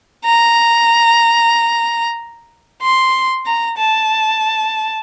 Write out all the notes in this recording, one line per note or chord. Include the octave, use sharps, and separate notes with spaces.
A#5
C6
A#5
A5